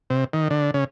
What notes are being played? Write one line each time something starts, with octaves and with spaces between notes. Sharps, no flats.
C3
D#3
D3
C#3